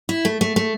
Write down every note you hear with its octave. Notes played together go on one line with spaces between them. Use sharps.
E4
A3
A3
A3